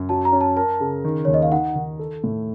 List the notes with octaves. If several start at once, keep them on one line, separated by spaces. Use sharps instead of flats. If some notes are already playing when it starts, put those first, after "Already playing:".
Already playing: F#2
F#3 A5
A#5
C#4
A5
A#4 A5
C#3
D#3
D#2 C#5
D#5
F5
D#4 F#5
D#3
A4
A2